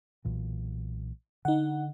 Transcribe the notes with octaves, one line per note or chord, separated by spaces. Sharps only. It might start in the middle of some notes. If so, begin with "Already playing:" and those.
B1 A#2 E3
D3 D#4 F#5